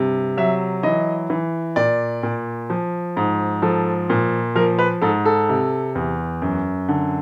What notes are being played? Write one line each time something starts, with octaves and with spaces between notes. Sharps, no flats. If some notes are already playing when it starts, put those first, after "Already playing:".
Already playing: G2 C3
F#3 E5
E3 D#5
E3
A#2 D5
A#2
F3
G#2
F3 A4
A#2
F3 A#4
B4
G#2 A4
A4
C3
E2
F#2
D3